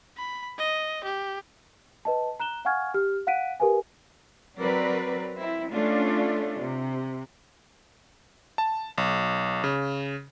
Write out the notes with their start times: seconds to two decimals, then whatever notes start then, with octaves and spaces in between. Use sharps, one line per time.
0.17 B5
0.58 D#5
1.04 G4
2.05 B4 D#5 A5
2.40 A#5 F#6 E7 G7
2.65 F5 F#5 G#5 C#6 F6 G#6
2.94 G4 F6
3.27 F5 F#5 F#6 B6 D7 D#7
3.60 G4 A#4 B4 F5 G#5
4.58 F#3 C4 A#4 B4 D5
5.35 C4 E4
5.72 A3 C#4 D4 F4
6.60 C3
8.58 A5
8.98 B1
9.64 C#3